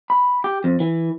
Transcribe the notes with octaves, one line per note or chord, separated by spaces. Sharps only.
B5
G4
F2
E3